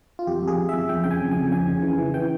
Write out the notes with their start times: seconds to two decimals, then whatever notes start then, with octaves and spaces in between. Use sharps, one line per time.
0.19 F4
0.27 F2 G4
0.43 F2 G#4
0.58 F2
0.69 F2 E5
0.89 F2 G5
1.04 C#3 G5
1.11 G#5
1.21 F2
1.31 G#5
1.37 F2
1.51 C#3 G#5
1.67 C#3
1.82 E3
1.98 E3
2.14 E3 G5